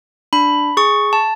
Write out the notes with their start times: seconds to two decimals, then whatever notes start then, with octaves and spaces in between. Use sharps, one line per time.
0.33 D4 B5
0.77 G#4 C#6
1.13 A5